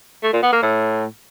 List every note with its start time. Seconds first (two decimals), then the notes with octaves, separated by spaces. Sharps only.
0.23 A3
0.33 A#2
0.43 B3
0.53 A#3
0.62 A2